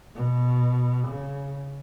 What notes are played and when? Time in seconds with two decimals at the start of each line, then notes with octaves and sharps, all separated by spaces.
0.15 B2
1.07 C#3